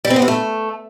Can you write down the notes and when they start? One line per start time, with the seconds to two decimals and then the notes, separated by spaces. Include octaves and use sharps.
0.05 G3
0.10 C4
0.16 B3
0.22 C3
0.28 A3